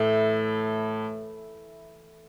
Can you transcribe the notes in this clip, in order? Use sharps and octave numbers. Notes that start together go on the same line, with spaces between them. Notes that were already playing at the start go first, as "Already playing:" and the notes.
Already playing: A2 E3 A3 E4 A4